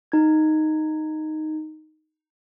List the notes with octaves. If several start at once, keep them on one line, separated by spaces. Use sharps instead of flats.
D#4 G#6